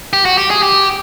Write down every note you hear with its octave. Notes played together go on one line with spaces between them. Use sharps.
G4
F#4
G4
G#4
G4